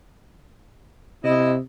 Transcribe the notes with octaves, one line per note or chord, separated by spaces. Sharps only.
C3 E4 D#5